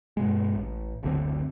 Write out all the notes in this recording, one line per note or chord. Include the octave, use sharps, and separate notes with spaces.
G2 B2 G#3
A1
F#1 D2 D3 C4